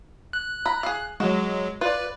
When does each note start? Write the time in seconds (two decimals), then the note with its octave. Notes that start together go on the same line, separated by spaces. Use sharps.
0.33 F#6
0.66 A#5 B5
0.83 G#4 F5
1.20 F#3 G#3 F#4
1.81 F4 B4 D5